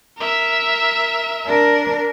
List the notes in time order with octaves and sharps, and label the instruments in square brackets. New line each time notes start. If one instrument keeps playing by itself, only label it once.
[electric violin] A#4 E5
[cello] D4 A#4